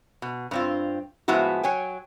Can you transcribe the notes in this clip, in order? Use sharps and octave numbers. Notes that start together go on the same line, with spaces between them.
B2
G2 C4 F4
A2 F3 G#3 B3 E4 F#4
F#3 C#5 G5 G#5